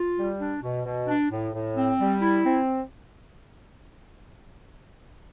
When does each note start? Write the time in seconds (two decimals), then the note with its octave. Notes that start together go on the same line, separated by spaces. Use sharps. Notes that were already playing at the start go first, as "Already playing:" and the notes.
Already playing: F4
0.17 G3
0.40 D4
0.62 B2
0.85 B2
1.07 D4
1.31 A2
1.53 A2
1.76 C4
1.99 G3
2.21 E4
2.44 C4